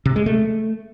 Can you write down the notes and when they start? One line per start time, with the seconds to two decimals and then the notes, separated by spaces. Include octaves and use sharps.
0.05 C3
0.16 G#3
0.26 A3